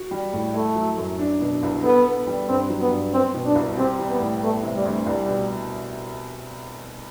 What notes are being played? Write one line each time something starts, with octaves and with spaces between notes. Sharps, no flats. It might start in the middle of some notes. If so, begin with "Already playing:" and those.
Already playing: F#4
G3
A2
A3 E4
F#3
F#2
D4
B2
C2
B3 A4
B3
G3
G2 C4
F#3
B3
G2
B3 C4
B2
D4
C2
C4 G4
G3
B3
A2
A3 B3
C3
G3
D2
C2 G3
B2